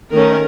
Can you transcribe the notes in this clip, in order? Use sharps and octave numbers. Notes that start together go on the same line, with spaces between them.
D#3 A3 C#4 A#4